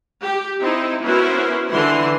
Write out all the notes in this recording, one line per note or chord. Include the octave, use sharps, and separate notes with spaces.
G4
C4 D#4 E4
B3 C#4 E4 F#4 A#4 C5
D3 E3 E4 C6